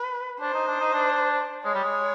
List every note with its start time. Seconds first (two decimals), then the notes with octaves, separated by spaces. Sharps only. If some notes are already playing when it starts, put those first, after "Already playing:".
Already playing: B4
0.41 D4 C5
0.54 D#4
0.67 D4
0.80 D#4
0.94 D4
1.65 G#3 C#5
1.75 G3
1.84 G#3